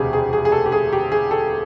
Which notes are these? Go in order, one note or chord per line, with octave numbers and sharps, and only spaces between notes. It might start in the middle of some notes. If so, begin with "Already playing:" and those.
Already playing: E1 D2 C3 G4 G#4
G#4
G#4
G#4
A4
G4
G#4
G4
G#4
A4